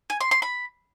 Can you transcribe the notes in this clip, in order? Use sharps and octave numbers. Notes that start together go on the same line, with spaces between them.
G#5
C6
C6
B5